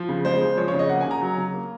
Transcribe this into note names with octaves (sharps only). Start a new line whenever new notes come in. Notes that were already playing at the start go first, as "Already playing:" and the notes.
Already playing: F3
C#3
G#3 C5
C#3
F3 C#5
C#5
C#3
D#5
A#3 F#5
G#5
C#3 A#5
F#3
C#3
A#3